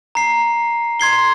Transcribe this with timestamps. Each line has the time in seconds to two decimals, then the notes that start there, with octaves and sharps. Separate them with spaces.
0.15 A#5 C7
1.00 C6 G#6 C7 G7